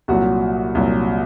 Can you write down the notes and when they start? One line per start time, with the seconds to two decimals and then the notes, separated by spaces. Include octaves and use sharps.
0.08 C2 A#2 F#3 F#4
0.75 C2 A#2 F#3